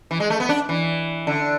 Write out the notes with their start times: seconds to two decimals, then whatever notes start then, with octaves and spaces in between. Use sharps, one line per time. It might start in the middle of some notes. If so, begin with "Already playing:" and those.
0.11 E3
0.20 G#3
0.30 A3
0.40 B3
0.49 D4
0.69 E3
1.27 D3